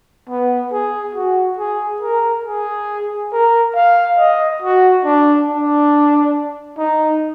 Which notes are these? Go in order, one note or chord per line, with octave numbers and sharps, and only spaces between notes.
B3
G#4
F#4
G#4
A#4
G#4
A#4
F5
D#5
F#4
D4
D4
D#4